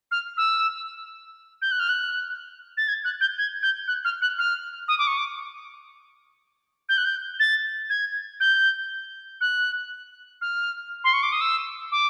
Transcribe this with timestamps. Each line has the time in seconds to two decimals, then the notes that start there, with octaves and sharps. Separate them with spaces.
0.11 F6
0.37 E6
1.62 G6
1.72 F#6
1.80 F6
1.89 F#6
2.77 A6
2.88 G#6
3.05 F#6
3.21 G6
3.38 G#6
3.63 G6
3.88 F#6
4.05 F6
4.22 F#6
4.39 F6
4.88 D#6
4.98 D6
5.07 C#6
5.18 D6
6.89 G6
6.98 F#6
7.05 G6
7.40 A6
7.90 G#6
8.40 G6
9.41 F#6
10.41 F6
11.04 C6
11.13 C#6
11.23 D6
11.32 D#6
11.41 E6
11.92 D6